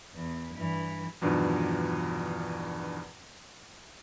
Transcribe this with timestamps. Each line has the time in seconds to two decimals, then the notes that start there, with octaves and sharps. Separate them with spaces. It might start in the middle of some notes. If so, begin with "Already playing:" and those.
0.13 E2
0.55 G2 E3
1.22 E2 G2 B2 D#3 F3